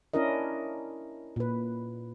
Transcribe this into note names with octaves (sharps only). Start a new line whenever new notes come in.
C#4 D4 E4 A#4 D#5
A#2 B4